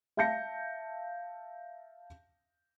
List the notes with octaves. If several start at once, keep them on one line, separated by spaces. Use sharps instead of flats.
E5 F5 A5 G6 A#6 C#7